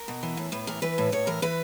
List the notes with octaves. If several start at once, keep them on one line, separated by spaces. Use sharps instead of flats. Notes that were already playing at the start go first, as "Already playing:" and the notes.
Already playing: A#4
B2
E3
A2
A2 B4
E3 A#4
E3 B4
A2
A2 C#5
E3 A#4
E3 B4